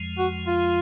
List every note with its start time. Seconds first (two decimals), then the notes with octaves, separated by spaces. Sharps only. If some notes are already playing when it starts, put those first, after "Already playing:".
Already playing: F2 F3 G#3
0.18 F#4
0.47 F4